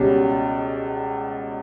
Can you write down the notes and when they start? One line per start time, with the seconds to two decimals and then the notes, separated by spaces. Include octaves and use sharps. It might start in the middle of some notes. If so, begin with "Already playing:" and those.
Already playing: C#2 B2 G3 C#4 G4